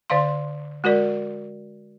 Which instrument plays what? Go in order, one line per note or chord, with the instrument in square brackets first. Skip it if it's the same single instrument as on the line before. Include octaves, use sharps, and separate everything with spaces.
[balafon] D3 D5 F5 C6
G#3 F#4 A#4 D5